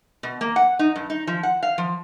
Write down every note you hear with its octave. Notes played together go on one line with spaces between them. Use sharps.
B2
A#3
F#5
D#4
G2
D#4
F3
F#5
F5
F3